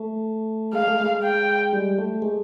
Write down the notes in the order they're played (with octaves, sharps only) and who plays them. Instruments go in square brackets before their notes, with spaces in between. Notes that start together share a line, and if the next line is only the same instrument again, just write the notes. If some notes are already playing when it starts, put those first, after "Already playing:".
Already playing: [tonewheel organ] A3
[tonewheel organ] G#3 [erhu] F5
[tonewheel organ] A3
G#3
[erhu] G5
[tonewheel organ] G3
A3
G#3